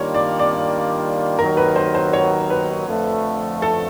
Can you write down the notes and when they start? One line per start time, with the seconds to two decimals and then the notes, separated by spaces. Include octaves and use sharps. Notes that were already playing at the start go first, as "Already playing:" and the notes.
Already playing: D#3 G3 A#3 D4 F4 C#5
0.15 D5
0.39 D5
1.39 D#2 D#3 F#3 A#4
1.57 B4
1.76 C5
1.95 C5
2.13 C#5
2.50 B4
2.87 F2 D3 F3 A3
3.62 A4